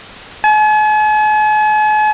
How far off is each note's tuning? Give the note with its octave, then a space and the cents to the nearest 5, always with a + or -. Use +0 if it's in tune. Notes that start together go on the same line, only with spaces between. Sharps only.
G#5 +45